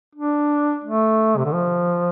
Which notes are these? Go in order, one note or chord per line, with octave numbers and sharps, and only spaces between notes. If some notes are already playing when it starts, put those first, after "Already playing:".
D4
A3
C3
D3
F3